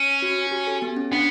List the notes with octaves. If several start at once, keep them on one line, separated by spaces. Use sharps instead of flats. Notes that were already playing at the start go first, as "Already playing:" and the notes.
Already playing: C#4
F#4
F#4
G4
A4
B3
C#4
B3 D4